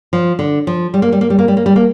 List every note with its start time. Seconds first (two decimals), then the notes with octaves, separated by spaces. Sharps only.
0.13 F3
0.39 D3
0.67 F3
0.94 G3
1.02 A#3
1.12 G3
1.21 A#3
1.30 G3
1.39 A#3
1.48 G3
1.57 A#3
1.66 G3
1.76 A#3